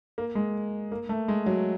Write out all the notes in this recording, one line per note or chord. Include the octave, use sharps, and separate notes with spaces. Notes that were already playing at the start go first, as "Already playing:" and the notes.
A#3
G#3
A#3
A3
G#3
F#3